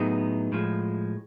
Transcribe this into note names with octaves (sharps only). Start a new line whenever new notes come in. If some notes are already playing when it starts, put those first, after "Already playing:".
Already playing: A2 F#3 B3 D#4 G#4
A2 F3 G#3